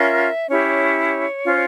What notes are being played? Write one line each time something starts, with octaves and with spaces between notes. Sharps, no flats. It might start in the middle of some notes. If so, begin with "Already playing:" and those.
Already playing: C#4 F4 A#4 E5
C#4 E4 G4 C#5
C#4 F4 C5